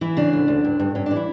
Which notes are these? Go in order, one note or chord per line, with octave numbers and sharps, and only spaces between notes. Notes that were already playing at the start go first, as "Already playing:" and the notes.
E3 E4
C#3 D4
D2
D2
G2
G2
G2 C#4
D4
E3
E4